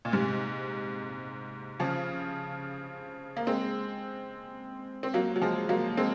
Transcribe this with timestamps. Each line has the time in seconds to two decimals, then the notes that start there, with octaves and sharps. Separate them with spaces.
0.05 A#2
0.12 G#2 C3
1.80 C#3 F3
3.37 A#3
3.47 G#3 C4
5.03 C4
5.14 F#3 A#3
5.36 F#3
5.42 F3 G#3
5.69 F#3 A#3
5.97 G#3 C4